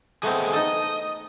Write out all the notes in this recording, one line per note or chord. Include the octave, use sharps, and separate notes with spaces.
A3 B3 C4 G#4 A4 D#5
D#4 A4 D#5